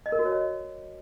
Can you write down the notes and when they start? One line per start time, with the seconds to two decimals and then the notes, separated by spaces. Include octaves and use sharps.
0.06 D#5
0.12 A#4
0.19 F#4
0.26 C#5
0.32 D#5